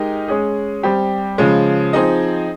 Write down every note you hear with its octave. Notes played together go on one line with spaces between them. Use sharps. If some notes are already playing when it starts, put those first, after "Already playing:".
Already playing: G#3 D#4 G4 A#4 D#5
G#3 C#4 G#4
G3 C4 G4
C#3 F3 G#3 C#4
F3 C4 D#4 G#4 D#5